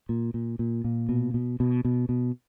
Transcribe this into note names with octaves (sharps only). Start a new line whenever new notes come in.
A#2
A#2
A#2
A#2
B2
B2
B2
B2
B2